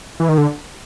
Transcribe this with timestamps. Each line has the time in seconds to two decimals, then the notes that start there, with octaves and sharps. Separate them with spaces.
0.20 E3
0.29 D#3
0.38 D3